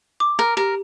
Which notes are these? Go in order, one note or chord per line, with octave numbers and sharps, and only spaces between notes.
D6
A#4
G4 A#4